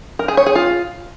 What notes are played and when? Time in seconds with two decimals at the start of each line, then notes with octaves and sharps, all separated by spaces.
0.19 A#4
0.28 G#4
0.37 C#5
0.46 G#4
0.55 F4